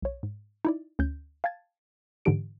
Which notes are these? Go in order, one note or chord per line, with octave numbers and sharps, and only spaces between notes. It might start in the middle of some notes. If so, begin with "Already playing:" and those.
B1 C#5
G#2
D#4 E4 D5
D2 C#4 G6
F5 G5 A5 G#6 A6
G#2 D3 E3 D4 G4 D7